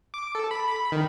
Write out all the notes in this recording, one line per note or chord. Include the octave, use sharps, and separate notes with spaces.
D6
A4
B5
B5
D#3